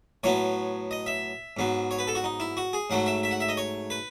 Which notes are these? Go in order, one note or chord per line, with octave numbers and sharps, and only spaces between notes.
A2 F#3 B3 C#5
D#5
E5
G#2 F#3 B3
C#5
B4
A4
F#4
D#4
E4
F#4
G#4
G#2 F#3 A3 F#5
E5
E5
F#5
E5
D#5
C#5
B4